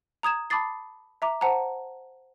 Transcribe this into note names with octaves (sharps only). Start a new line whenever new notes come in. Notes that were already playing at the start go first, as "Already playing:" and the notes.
A#5 D#6 G#6 E7
A5 B5 D6 D#6 A6 C7
E5 A#5 D6
C5 F#5 A5 A#5